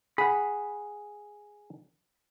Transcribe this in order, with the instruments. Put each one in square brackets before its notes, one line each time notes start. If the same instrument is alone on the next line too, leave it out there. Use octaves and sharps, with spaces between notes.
[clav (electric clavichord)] G#4 F#5 [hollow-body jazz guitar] B5